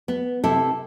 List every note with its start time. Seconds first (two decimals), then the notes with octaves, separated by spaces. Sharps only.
0.08 B3
0.44 C3 E4 A4